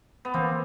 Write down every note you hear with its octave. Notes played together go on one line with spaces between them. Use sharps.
B3
E3 A#3 C4